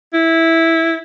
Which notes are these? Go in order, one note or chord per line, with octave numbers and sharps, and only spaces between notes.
E4